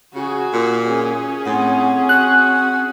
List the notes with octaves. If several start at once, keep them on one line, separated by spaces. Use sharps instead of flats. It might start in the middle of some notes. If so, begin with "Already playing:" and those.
C#3 F#4 G#4
A#2
C#4 G#4
A2 C4 F#5
F#4 F#6